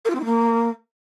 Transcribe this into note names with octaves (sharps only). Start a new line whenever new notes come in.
A#4
F4
C4
E4
A#3